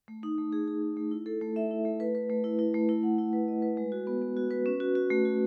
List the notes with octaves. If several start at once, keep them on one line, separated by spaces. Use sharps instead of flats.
A3
D#4
A3
G#4
G#4
G#4
A3
E4
A4
A3
E5
E4
A3
B4
B4
A3
E4
E4
A3
E4
F#5
E4
B4
D#5
B4
G#3
F#4
B3
B3
F#4
B4
C#4
F#4
F#4
A3
F#4